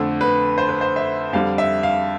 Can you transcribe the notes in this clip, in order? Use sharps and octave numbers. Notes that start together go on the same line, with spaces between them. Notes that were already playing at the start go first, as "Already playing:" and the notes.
Already playing: F2 D3 A3 A4
B4
C5
B4
C5
E5
F2 D3 G3 F5
E5
F5